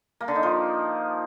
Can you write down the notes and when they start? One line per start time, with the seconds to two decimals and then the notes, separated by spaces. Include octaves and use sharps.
0.20 A#3
0.28 D3
0.35 D#4
0.43 F3